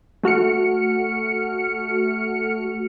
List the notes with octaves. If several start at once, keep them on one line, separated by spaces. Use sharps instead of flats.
A3 F#4 F6 C#7